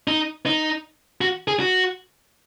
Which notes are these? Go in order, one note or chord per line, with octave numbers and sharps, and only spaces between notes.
D#4
D#4
F#4
G#4
F#4